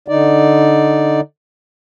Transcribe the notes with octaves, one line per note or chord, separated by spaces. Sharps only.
D3 D#4 D5